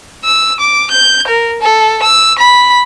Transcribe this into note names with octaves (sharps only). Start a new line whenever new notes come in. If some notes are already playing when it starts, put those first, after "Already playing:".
E6
D6
G6
A#4
A4
E6
B5